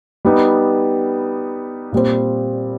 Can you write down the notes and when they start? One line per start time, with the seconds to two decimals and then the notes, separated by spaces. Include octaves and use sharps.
0.25 G3 B3 D#4
1.92 A#2 G3 C4